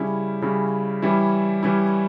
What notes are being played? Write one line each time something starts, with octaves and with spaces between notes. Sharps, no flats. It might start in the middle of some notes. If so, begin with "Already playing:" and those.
Already playing: C#3 G3 C#4 E4
C#3 G3 C#4 E4
E3 G3 C#4 E4
E3 G3 C#4 E4